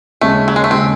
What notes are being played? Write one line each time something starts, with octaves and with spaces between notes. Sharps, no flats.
D#2 C#3 G#3 A3 C#4
F#3
G#3
A3
C#3 G#3 C4 C#4